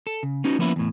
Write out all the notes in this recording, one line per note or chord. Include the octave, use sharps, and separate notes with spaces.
A4
C#3
B3 C#4 D#4 F#4
F3 A#3 B3 C#4 E4 B4
E2 A2